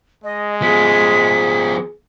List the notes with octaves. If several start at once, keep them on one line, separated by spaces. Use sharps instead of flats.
G#3 D#5
F3 B3 G#4 B6